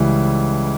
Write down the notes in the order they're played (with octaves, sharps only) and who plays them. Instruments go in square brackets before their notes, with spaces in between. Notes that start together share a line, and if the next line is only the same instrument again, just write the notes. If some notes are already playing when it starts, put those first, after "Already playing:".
Already playing: [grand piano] C#2 C#3 E3 G3